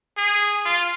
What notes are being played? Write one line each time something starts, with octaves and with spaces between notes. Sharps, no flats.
G#4
F4